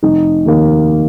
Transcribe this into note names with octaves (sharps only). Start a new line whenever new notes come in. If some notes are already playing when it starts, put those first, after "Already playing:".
F1 D#4
D#2 D#3 A#3